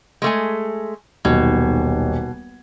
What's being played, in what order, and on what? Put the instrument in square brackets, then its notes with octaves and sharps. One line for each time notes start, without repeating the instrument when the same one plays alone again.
[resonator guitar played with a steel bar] G#3 A3 G#5
[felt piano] D#1 B1 G#6 [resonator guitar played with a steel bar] B2